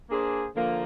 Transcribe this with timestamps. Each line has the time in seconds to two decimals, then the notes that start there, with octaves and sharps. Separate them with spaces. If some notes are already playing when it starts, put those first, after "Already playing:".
0.08 A#3 D4 G#4 C5
0.55 D3 F3 A#3